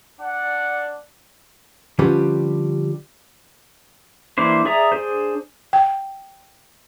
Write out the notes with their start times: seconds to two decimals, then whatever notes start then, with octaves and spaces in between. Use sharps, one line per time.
0.20 D4 D5 F#5
1.99 D3 F3 G3 C#4 G4 B4
4.38 E3 A#3 D4 E4 C5
4.65 G#4 D5 E5 A#5 D#6
4.92 D4 G#4 C5
5.73 G5